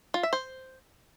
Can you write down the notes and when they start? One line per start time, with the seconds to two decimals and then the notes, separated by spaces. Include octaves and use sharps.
0.14 F4
0.23 E5
0.33 C5